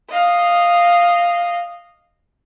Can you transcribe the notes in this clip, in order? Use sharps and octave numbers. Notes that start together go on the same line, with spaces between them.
D#5 F5